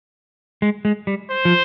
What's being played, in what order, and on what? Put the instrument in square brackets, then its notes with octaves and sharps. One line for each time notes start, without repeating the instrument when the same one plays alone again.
[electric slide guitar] G#3
G#3
G3
[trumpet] C5
[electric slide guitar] F3